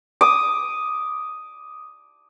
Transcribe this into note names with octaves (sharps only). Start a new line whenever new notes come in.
D6 D#6